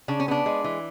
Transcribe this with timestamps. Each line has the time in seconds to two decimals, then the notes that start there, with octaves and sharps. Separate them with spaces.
0.08 C#3 D4
0.20 C#4
0.28 B3 D4
0.46 G#3
0.64 E3